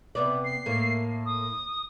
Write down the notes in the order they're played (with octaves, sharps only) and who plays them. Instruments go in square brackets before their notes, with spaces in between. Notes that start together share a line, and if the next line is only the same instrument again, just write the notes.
[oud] C3 B3 D5
[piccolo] C7
[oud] A2 A#3
[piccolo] D#6